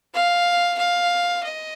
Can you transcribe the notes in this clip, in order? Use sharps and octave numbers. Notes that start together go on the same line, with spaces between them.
F5
F5
D#5